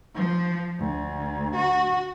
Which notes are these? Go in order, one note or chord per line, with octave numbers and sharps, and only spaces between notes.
F3
D2
F#4